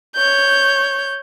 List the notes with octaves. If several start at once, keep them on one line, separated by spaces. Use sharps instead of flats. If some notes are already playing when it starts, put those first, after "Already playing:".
C#5 G6